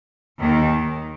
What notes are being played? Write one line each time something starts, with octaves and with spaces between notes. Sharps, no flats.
D#2 D#3